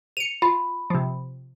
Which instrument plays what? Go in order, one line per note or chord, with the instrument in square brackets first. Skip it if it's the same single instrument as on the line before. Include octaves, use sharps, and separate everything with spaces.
[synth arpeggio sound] C#7 D#7 [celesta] F7
[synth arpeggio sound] F4 [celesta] B5
[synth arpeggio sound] C3 F3